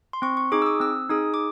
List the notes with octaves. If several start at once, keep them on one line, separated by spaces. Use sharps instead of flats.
C6
C4 C#6
C#6
D#4 G#4 D6
E6
D#6
C4 E6
D#4 G#4 D#6
D6